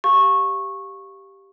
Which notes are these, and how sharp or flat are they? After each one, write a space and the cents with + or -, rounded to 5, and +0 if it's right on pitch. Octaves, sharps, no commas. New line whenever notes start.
G4 +0 F5 +0 C#6 -15